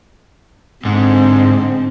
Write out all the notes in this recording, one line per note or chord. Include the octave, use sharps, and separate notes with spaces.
G#2 D3 C4